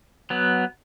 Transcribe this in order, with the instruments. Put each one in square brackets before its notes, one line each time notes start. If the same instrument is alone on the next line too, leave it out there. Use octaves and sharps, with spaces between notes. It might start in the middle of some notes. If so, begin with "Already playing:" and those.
[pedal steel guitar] F#3 B3